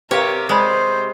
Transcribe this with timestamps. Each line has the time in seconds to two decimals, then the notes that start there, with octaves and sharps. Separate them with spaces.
0.11 C3 G4 A#4 B4 C#5 F5
0.49 G#3 C5 D5 G#5 B5